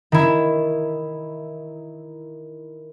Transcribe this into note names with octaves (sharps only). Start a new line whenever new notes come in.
D#3 E4